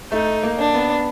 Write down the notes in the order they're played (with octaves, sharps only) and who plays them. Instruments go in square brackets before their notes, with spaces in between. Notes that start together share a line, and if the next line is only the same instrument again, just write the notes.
[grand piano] A3 [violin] D#4
[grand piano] A#3
[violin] D4
[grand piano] B3